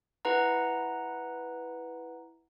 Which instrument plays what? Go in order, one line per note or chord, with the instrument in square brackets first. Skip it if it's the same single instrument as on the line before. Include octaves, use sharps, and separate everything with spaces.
[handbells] E4 B4 F#5 A#5